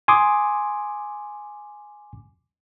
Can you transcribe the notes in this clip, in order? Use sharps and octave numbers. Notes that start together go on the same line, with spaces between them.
G#5 C6 D6 D#6